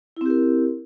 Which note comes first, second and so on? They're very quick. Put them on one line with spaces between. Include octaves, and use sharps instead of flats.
E4 C4 G4 A#4